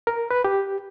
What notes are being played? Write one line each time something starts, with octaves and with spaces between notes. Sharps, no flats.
A#4
B4
G4